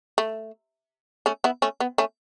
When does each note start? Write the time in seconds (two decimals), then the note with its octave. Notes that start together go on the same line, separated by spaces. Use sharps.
0.18 A3
1.26 A3 C#4
1.44 B3 E4
1.62 A3 C#4
1.80 B3
1.98 A3 C#4